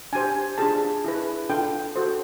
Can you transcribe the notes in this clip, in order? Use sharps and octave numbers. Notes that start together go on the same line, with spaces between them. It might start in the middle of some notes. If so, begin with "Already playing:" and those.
D4 G4 C5 G#5
D4 F4 G#4 A5
E4 G#4 B4
D4 F4 A4 G5
F#4 A4 C5